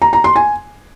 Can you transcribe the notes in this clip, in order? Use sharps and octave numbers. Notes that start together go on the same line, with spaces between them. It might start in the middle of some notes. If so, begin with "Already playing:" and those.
A#5
A#5
C6
G#5